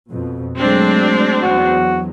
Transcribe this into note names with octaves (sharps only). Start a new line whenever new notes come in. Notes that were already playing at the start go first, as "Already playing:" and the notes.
F2 B2
F#3 G#3 A3 C4 D4
E2 F#3 F#4